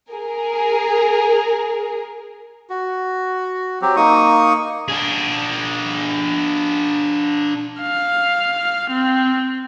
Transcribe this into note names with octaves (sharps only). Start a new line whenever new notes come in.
G#4 A#4
F#4
F#3 C4 G4
A#3 D#4 C#6 D#6
D4 G#4
F5
C4